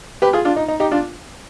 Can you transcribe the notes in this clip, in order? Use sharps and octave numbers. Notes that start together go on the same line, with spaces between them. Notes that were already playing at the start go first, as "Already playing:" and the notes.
G4 B4
F4 G#4
D4 F4
D#4
D#4
D#4 G4
D4 F4